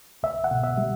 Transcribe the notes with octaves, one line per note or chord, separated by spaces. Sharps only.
C2 E5
F#5
B2
E5
G3